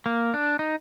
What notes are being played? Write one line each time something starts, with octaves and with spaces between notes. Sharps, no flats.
A#3
D4
D#4